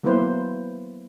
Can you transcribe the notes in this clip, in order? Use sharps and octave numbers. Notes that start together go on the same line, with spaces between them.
F#3 A#3 B3 E4 B4 C5